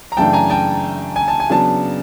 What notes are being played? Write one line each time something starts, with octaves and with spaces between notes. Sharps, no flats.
A#5
F#2 C#3 E3 A3 D4 G5 A5
G#5 A#5
G5 A5
G#5
A5
G#5
C#3 F#3 B3 D4 A5